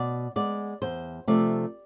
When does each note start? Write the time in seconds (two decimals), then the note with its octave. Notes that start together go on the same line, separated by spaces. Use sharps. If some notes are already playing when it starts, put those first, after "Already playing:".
Already playing: B2 D5
0.36 G#3 B3 D5
0.82 E2 C5
1.28 C3 F3 A3 D5